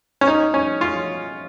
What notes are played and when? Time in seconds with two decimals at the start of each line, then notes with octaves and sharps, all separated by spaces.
0.21 C#4
0.27 D#4
0.54 C#4
0.81 F4